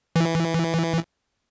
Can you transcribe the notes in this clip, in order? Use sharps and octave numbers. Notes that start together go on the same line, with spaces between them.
E3